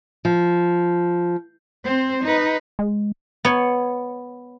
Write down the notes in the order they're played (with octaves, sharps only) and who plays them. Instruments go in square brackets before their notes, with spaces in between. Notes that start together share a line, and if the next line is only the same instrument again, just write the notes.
[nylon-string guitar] F3
[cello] C4 C5
D#4 B4
[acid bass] G#3
[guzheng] B3 C#5